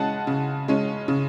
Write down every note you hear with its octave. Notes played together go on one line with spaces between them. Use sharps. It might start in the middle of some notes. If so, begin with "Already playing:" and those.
Already playing: C#3 G#3 C#4 F#5 A5
C#3
G#3 C#4
C#3